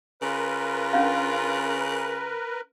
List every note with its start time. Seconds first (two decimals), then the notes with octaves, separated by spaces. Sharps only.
0.22 C#3 F4 A#4 B4
0.93 C#4 D4 F5